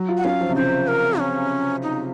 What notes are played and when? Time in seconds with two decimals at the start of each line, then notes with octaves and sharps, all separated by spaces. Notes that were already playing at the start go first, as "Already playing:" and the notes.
Already playing: F#3
0.08 F4
0.17 F#5
0.24 C#4 F5
0.41 F3
0.49 C3
0.56 C#3 C5
0.88 A#4
1.19 C#4
1.83 D#4